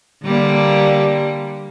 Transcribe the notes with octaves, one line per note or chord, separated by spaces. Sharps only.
D3 G3 A#3